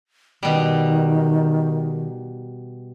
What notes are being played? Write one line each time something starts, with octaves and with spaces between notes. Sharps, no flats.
B2 D#3 G3